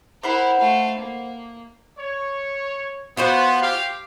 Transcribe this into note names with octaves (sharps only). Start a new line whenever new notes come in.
E4 A#4 C5 F#5 B5
A3 F5
A#3
C#5
B3 F4 F#4 C5
G4 F5